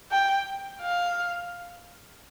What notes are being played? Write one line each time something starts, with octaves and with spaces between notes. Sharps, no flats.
G5
F5